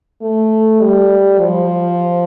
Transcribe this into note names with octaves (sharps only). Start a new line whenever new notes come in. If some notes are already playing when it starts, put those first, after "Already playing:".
A3
G3
F3